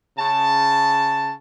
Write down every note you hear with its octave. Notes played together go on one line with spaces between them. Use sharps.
C#3 A5